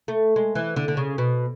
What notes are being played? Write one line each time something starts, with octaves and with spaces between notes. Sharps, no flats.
A3
G#3
E3
D3
D3
C#3
B2